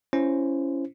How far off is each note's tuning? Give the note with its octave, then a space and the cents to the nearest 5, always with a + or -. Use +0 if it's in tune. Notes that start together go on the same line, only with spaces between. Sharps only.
C#4 +0 E4 +25 C5 +0